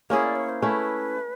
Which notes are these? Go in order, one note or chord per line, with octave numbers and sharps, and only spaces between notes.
A#3 C#4 E4 G#4 C#5
D5
C#5
C5
A3 C#4 E4 B4